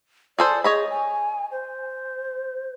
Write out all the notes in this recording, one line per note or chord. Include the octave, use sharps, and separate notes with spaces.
G#4 A4 C5 D5
G#4 C#5 D#5 B5
G#5
C5